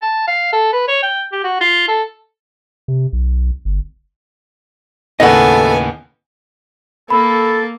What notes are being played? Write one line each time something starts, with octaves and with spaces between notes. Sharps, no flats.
A5
F5
A4
B4
C#5
G5
G4
F#4
F4
A4
C3
B1
G1
D#2 A2 C#3 B3 A4 D#5 F#5 G#5
A#3 A4 B5